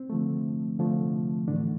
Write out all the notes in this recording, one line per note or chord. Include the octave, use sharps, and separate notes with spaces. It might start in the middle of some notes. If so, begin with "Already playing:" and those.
Already playing: C4
D3 F3 A3
D3 F3 A3
A2 D3 E3 A3 D4